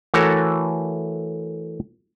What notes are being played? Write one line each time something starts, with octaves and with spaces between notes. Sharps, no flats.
E3 A3 F#4 A4 A#4 C#5